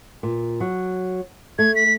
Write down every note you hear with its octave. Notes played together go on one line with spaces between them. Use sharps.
A#2
F#3
A3 G#6
B6